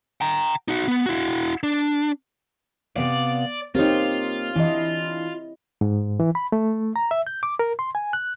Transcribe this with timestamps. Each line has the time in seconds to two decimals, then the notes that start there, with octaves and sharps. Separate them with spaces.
0.21 G5 A#5
0.68 D#4 F#4
0.88 B3
1.06 E4 F#4
1.63 D4
2.96 C3 B3 D5 F5
3.75 A#3 C4 D#4 F4 G4 C#5
4.56 E3 D4 E4 D#5
5.81 G#2
6.20 E3
6.35 B5
6.52 A3
6.96 A#5
7.11 E5
7.27 G6
7.43 D6
7.59 A#4
7.79 C6
7.95 G#5
8.13 F#6